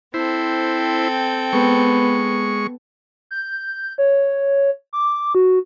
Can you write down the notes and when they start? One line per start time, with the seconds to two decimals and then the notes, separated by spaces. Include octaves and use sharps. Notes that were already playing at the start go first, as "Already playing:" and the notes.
0.14 C4 E4 A4 C5 G5
1.53 G#3 B3 C#6
3.31 G6
3.98 C#5
4.93 D6
5.35 F#4